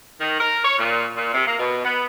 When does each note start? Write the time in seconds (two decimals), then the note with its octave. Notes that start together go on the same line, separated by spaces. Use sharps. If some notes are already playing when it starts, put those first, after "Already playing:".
0.21 D#3
0.40 A#4
0.65 C#5
0.78 A#2
1.17 A#2
1.34 C3
1.47 A#3
1.59 B2
1.85 B3